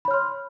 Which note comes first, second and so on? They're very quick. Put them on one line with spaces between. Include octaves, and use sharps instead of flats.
B5 C#5 F6 C6